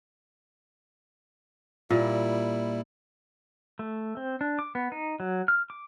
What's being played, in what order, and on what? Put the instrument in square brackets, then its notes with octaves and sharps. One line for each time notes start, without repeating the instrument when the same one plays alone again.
[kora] A#2 [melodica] G3 E4
[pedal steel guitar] A3
C4
D4
D6
B3
D#4
F#3
F6
D6